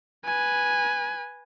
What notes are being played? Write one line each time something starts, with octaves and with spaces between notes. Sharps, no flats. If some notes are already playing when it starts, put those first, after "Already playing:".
B4 G#5